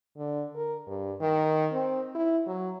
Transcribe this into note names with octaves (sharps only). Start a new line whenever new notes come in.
D3
A#4
G2
D#3
C4
E4
F#3